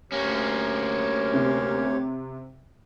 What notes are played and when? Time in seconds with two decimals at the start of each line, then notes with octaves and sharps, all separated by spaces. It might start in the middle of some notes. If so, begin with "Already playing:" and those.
0.12 D2 A#3 C#4 G4 C#5
1.34 C3